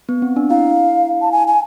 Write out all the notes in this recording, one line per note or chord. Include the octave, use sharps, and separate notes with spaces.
B3
C4
D4
E4 F5
A5
G#5
G#5